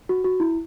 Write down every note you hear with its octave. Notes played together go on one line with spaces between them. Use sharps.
F#4
F#4
E4